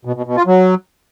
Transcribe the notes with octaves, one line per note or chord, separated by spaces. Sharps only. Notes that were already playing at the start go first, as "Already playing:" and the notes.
B2
B2
B2
F4
F#3